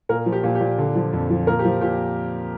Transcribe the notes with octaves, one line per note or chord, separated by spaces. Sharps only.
A#2 A#4
F3
G4
A#2
G4
A#2
D3
F3
F2
F3
A#2 A#4
G4
F3
A#2 G4